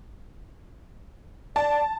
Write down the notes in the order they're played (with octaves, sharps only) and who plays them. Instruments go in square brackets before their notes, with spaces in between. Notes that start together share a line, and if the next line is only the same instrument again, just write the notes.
[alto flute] D5 [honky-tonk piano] A5